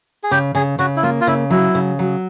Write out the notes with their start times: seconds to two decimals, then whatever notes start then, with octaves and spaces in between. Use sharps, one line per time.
0.24 G#4
0.31 C#3 G4
0.55 C#3 G#4
0.79 C#3 F#4
0.97 E4
1.03 A#3 F4
1.21 F4
1.27 C#3 E4
1.50 F#3 E4
1.75 C#3
1.99 F#3